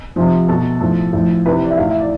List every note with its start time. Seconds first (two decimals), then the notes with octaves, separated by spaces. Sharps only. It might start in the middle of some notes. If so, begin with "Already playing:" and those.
0.16 C3 F3
0.48 B2 A4
0.80 A2 F3 A4
1.13 A2 F3
1.45 C3 E3 B4
1.64 D5
1.71 E5
1.77 A2 E3 F5
1.89 E5
2.00 D5